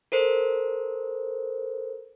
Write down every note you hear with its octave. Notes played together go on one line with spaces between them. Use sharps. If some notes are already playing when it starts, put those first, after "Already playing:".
A4 A#4 C5